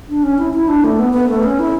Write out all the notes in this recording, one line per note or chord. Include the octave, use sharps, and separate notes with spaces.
D4
C#4
E4
E4
D4
A3
B3
B3
A3
C#4
E4